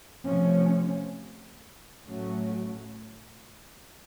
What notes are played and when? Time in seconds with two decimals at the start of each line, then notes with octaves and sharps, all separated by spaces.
0.25 C3 F3 A3 C#4
2.06 A2 F#3 A3 C#4